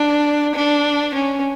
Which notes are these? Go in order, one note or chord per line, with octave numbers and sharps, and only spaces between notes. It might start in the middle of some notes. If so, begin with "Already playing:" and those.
Already playing: D4
D4
C#4